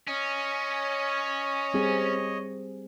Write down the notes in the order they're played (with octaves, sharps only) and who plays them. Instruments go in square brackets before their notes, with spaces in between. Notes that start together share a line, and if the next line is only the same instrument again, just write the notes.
[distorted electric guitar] C#4 [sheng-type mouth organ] C#5 D#5
[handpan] G3 C4 G#4